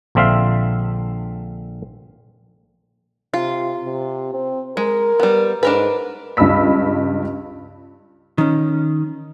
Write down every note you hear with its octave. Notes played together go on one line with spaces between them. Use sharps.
A#1 D3 C4 E5 F5
C3 F4
C3
C4
G#3 A#4
G3 B3
G#2 D4 A#4 B4
C#2 G2 D#5 B5 E6 B6
D#3 C#4